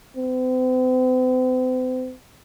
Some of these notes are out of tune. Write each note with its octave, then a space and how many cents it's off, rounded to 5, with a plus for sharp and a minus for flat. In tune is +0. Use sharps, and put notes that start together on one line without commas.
C4 -45